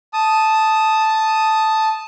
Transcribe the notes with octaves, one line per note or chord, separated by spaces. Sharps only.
A5 D#6